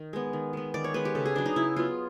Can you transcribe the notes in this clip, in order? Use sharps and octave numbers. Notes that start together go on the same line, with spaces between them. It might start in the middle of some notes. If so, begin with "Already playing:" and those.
Already playing: D#3
G#3 B3
D#3
G#3 B3
D#3 D5
C#5
G#3 B3 B4
G4
C#3 A4
G#4
F#3 B3 D4
D#4
C#3 E4
F#3 B3 F4